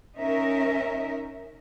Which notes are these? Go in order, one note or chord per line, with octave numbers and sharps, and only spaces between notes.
C#4 D#4 A#4 E5